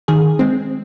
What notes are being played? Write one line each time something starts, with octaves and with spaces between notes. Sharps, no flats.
D#3 G#4
G#3 C4